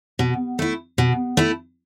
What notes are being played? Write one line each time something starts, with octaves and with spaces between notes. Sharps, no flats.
B2
A3 E4
B2
A3 E4